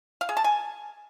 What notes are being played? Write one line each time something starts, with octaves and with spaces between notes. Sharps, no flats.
F5
G#4
A5
G#5